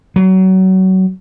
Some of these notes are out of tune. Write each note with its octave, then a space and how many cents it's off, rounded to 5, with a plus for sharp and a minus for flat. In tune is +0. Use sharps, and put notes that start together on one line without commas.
F#3 +25